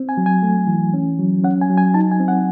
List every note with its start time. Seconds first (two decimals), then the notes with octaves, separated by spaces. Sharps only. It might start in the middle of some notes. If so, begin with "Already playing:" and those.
Already playing: C4
0.09 G#5
0.17 F#3
0.26 G#5
0.43 A3
0.67 E3
0.94 C#4
1.19 F#3
1.44 C#4 F#5
1.61 G#5
1.69 F#3
1.78 G#5
1.94 D#4 A5
2.12 G#5
2.20 C4
2.28 F#5